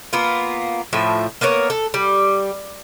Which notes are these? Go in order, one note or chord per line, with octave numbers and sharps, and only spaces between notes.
A#3 B3 F4
A2 F3 E5
A#3 B3 A#4 C#5
A4
G3